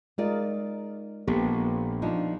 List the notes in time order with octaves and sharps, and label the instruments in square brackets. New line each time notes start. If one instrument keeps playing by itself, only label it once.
[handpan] G#3 A#4 D#5 [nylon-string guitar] D#4 F4 D5
[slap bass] A#1 [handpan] A#3 B3 G4 [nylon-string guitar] A4
[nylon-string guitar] F3 D4 D#4